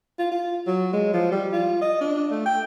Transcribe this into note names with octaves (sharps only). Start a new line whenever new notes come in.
F4
F4
F#3
G#3
F3
G3
F4
D#5
D4
A3
G5